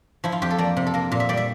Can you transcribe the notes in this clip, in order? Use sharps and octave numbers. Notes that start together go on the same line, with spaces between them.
F3 E4
F4
F2 G4
A4
A#3 D5
C3
A4
A#3 A#4
A#2
E5
G3 D5
E5